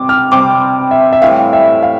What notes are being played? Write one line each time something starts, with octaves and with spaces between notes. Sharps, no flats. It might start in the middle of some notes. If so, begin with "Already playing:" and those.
Already playing: C3 G3 C4 D6
F6
C3 G3 C4 D6
E5
E5
A2 E3 G3 F5
E5
F5